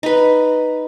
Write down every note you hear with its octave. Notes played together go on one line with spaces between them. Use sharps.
D#4 B4